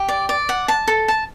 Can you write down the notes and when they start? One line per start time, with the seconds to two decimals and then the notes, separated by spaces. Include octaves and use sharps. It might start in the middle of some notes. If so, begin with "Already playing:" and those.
Already playing: G4
0.08 D5
0.29 D5
0.49 F#5
0.68 A5
0.88 A4
1.08 A5